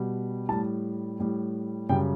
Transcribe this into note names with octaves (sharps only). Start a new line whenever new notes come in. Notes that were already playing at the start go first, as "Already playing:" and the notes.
Already playing: B2 G3
A2 G3 A5
A2 G3
F#2 C#3 G3 G5